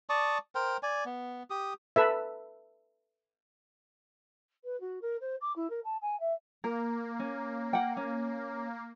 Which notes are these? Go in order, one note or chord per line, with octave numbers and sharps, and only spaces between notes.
D5 A5 C#6 D#6
A#4 C5 G5
D5 G#5
B3
G4 D#6
A4 B4 E5
B4
F#4
A#4
C5
D6
E4
A#4
A5
G#5
E5
A#3 A#4
C#4
F#5 G5
C#4